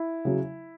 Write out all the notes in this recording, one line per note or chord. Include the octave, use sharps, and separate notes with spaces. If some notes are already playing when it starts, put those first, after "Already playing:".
Already playing: E4
C#3 F#3